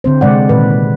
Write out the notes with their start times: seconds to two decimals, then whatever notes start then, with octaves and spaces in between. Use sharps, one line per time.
0.04 D3 C4 C5
0.21 C3 G#3 D5 F#5
0.49 A#2 D#3 B4